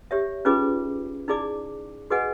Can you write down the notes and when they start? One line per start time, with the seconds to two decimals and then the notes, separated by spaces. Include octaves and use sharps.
0.11 G4 C#5 E5
0.45 C#4 D#4 F4 G#4 B4 D6
1.28 D#4 E4 G#4 D5 D6
2.10 F#4 G#4 B4 D#5 F#5 G#5